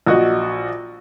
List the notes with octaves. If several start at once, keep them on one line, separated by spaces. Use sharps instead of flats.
A#1 F#4 D#5